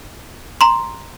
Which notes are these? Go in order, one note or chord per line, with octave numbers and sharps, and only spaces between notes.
A#5 C6